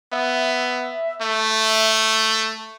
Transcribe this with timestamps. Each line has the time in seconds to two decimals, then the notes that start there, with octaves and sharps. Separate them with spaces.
0.12 B3 E5
1.21 A3